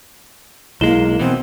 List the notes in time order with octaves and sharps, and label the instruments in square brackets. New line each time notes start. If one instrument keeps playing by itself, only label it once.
[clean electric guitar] B1 G#3 [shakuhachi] A#3 [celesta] E4 E7 G7
[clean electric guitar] B2 E3 [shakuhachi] C4